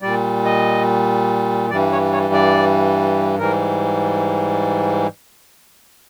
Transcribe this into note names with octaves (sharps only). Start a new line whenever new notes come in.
A#2 G3 D5
D#5
G2 E3 G3 D5
C#5
C#5
D5
G#2 E3 G3 A#4